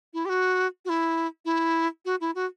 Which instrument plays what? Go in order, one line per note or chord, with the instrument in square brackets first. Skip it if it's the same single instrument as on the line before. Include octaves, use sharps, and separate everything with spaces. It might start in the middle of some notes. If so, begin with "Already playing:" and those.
[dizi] E4
G4
F#4
F#4
E4
E4
F#4
E4
F#4